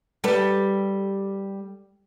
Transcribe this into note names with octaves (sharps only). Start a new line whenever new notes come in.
G3 A4 B4